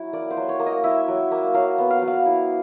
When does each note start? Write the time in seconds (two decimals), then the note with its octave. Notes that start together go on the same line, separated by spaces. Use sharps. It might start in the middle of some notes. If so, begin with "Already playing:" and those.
Already playing: F#3 E4
0.13 A#3 D5
0.31 C5
0.37 F#3
0.49 C#5
0.60 A#3
0.66 D#5
0.84 E4 E5
1.08 F#3
1.32 A#3
1.54 F#3 F5
1.78 B3
1.90 F5
1.99 F#3 F#5
2.08 F5
2.26 E4